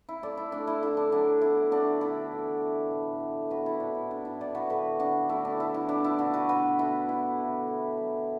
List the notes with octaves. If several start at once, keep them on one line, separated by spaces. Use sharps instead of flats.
E4
A3 A4 D5
E4
A3 D4
E4
D3 E4
D4
F#3 D4
B3 E4
D3 D4 F#4
D3 E4 A4
E3
B3
A2
B3
B3 F#4 B4
E4 A4
A2 D4
E4
A2 D4
E4
B3 A4 D5
F#4 B4
D3 F#4 B4
D3 D4 F#4
A3 E4
D4
D3 E4
E4
B3 D4
E4
B2 D4 F#4
F#4 B4
B2 F#4 B4
B3 E4 A4
B3 E4
D3
B3
F#3